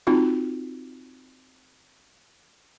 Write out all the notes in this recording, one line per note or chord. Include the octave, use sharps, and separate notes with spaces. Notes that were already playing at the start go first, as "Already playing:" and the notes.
C4 D#4 F4 F#4